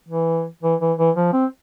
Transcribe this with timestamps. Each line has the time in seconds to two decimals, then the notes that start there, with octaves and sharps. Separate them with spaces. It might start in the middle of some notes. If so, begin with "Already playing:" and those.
0.09 E3
0.63 E3
0.80 E3
0.98 E3
1.16 F3
1.33 C4